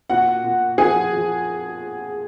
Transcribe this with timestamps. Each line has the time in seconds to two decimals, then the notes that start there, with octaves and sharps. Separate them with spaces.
0.10 A#2 F#4 F#5
0.44 A#2
0.78 F3 G#4 G#5
1.12 F3